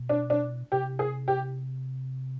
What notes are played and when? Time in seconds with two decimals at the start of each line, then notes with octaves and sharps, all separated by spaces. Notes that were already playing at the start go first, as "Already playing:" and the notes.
Already playing: B2
0.09 D4
0.30 D4
0.72 C3 G4
0.99 G#4
1.28 G4